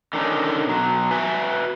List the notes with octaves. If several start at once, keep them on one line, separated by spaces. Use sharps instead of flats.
D3 D#3 C4 C#4 D#4
B2 F#3
F#4 B4 E5 G#5